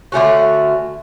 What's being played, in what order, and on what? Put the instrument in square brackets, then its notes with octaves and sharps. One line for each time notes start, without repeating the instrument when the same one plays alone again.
[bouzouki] D3 A3 C#4 F#4